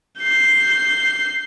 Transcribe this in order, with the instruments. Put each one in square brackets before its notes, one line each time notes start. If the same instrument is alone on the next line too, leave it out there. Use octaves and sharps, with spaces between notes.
[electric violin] G6 C7